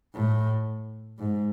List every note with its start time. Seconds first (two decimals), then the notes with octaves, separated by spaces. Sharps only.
0.14 A2
1.19 G#2